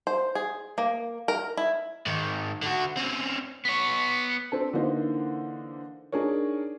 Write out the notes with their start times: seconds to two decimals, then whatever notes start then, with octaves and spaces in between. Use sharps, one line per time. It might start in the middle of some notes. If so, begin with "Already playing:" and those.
0.07 C5
0.35 G#4
0.78 A#3
1.28 A#4
1.57 E4
2.06 G#2 D#3
2.62 D3 F#4
2.97 C4 C#4
3.65 B3 C#5
4.52 C4 D4 A4
4.73 D3 E3 A#3 D#4 C5
6.12 D4 D#4 G#4 A#4 C#5